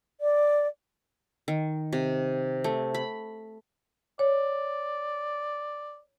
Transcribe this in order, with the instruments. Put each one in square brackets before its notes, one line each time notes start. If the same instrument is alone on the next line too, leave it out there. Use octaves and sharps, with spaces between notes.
[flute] D5
[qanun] D#3
C3
A3
B5
[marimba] C#5 [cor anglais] D5